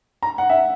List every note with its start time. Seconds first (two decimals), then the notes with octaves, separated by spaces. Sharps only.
0.22 A#5
0.38 F#5
0.50 E5